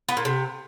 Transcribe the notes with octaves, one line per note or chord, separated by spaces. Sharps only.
B3
A#2
C3